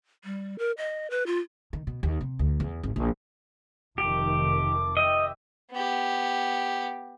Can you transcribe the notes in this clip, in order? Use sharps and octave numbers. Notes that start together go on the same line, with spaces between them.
G3
A#4
D#5
B4
F4
D#3
B2
D#2
C3
D2
E2
G#1
A#1
F1 D#3 A3 G4 D6
C4 G4 D#5 E5
B3 G4